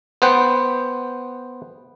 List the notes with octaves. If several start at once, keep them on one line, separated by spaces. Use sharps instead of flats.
B3 C5 F#5 G5